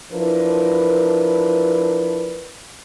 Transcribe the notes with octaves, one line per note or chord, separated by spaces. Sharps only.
F3 D4 E4 A#4 B4